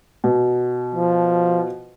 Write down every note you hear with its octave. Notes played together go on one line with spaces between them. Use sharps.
B2
F3